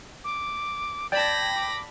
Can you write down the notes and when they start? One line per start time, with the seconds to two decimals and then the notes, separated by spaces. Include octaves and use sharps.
0.24 D6
1.12 D5 G5 A5 B5 G#6 A#6
1.55 D6